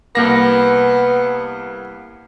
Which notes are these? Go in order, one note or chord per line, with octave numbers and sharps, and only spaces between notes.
C2 A#3 B3 A#6